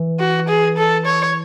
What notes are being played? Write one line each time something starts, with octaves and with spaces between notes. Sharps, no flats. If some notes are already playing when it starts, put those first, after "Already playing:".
Already playing: E3
F#4
G#4
A4
C#5